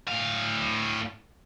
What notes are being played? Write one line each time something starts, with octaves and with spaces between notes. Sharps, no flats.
A2 F5